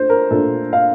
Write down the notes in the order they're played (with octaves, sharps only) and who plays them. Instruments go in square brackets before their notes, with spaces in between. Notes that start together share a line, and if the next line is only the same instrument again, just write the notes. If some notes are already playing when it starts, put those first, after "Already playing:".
Already playing: [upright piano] A3 D4 C5
A#4
A#2 A3 D4 A4
F5